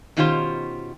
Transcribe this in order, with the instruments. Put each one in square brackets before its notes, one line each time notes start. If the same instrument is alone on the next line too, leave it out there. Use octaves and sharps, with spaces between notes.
[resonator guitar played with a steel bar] B2 D#3 C#4 F4 G4 C5